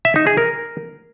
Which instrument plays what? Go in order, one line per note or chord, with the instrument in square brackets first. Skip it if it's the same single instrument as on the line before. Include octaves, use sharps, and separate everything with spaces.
[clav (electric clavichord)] E5
D#4
G#4
A#4